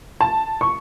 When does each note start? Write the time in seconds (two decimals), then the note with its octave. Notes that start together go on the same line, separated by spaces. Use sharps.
0.21 A5
0.61 C#6